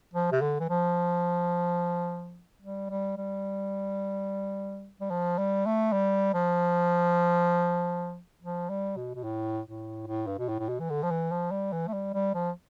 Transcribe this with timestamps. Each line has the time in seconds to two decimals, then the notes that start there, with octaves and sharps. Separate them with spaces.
0.13 F3
0.32 C3
0.42 D3
0.60 E3
0.69 F3
2.62 G3
2.90 G3
3.17 G3
5.00 G3
5.11 F3
5.38 G3
5.66 A3
5.92 G3
6.34 F3
8.42 F3
8.69 G3
8.97 B2
9.15 B2
9.24 A2
9.66 A2
10.07 A2
10.27 G2
10.39 B2
10.49 A2
10.59 A2
10.69 B2
10.80 E3
10.90 D3
11.03 F3
11.11 E3
11.31 F3
11.51 G3
11.73 E3
11.88 A3
11.93 G3
12.14 G3
12.34 F3